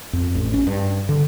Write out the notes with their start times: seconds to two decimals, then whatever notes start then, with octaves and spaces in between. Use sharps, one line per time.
0.13 F2
0.35 A1
0.54 C#4
0.67 G2
1.09 D3